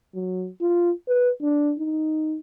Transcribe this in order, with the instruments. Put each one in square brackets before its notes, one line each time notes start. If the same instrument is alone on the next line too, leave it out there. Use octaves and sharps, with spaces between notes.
[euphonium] F#3
F4
B4
D4
D#4